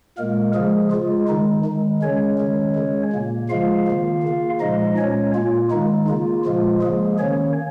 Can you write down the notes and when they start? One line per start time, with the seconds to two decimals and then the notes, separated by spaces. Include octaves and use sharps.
0.18 A#2 G#3 A#3 A#4
0.55 C#3 F3 G#3 G#4
0.91 C#3 G#3 F4
1.28 D#3 G#3 D#4
1.65 D#3 G#3
2.02 C#3 G#3 C#4 C#5
2.39 D#3 G#3
2.76 C#3 G#3
3.13 A#2 A#3
3.49 C#3 F3 G#3 F4 F5
3.87 D#3 A#3
4.24 C#3 A#3
4.60 A#2 F3 G#3 D#4 D#5
4.97 A#2 G#3 C#4 C#5
5.34 A#2 A#3 F4
5.71 D#3 G#3 D#4
6.08 C#3 A#3 F4
6.45 A#2 F3 G#3 F4
6.82 C#3 F3 G#3 A#3 G#4
7.19 D#3 A#3 C#4 C#5